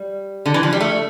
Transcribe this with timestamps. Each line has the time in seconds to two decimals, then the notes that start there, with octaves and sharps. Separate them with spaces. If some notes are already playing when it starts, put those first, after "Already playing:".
Already playing: G3
0.46 D3
0.54 E3
0.63 F3
0.73 G3
0.80 A3